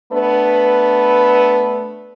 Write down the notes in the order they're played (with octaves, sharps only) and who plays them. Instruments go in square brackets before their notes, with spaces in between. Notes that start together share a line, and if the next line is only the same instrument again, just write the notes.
[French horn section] A3 B3 D4 B4